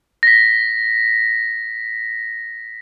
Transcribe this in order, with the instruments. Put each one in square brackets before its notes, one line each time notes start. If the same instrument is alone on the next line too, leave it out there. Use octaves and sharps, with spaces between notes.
[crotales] A#6 B6